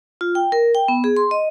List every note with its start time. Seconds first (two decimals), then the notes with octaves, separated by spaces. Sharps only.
0.21 F4
0.35 G5
0.52 A#4
0.75 G5
0.88 B3
1.04 G#4
1.17 C6
1.31 D#5